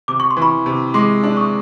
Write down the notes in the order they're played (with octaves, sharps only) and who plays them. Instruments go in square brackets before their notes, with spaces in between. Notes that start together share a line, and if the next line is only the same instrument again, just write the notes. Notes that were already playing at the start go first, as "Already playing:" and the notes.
[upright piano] C3 [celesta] D6
[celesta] C#6
C6
[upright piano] E3
[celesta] B5 C#6
[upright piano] C3
[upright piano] G#3 [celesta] C6 D6
[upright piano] D4
[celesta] C#6 D#6